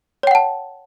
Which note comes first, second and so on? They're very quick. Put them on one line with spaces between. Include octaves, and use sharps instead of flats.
C#5 G5 F#5 A5